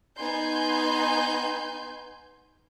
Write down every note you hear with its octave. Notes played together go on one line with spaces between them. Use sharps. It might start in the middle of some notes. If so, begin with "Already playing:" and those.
B3 D#4 G#5 C6 G6